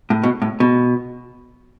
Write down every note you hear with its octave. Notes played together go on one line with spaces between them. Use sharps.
A2
B2
A2
B2